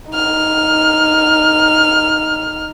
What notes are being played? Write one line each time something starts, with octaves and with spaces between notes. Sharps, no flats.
D#4 F6